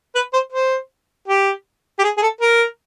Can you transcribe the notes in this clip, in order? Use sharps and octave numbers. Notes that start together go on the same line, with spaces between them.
B4
C5
C5
G4
G4
G#4
G#4
A4
A#4